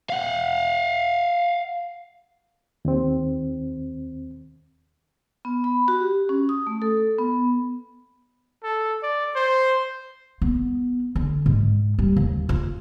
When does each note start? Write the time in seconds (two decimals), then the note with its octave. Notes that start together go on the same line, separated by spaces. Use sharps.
0.10 F5 F#5
2.85 D#2 C4
5.45 B3
5.64 B5
5.88 F#4
6.01 G4
6.29 C#4
6.49 D#6
6.67 A3
6.82 A4
7.19 B3
8.64 A4
9.03 D5
9.36 C5
10.42 B3
11.16 D3
11.46 G#2
11.99 G3
12.17 D#2
12.49 F4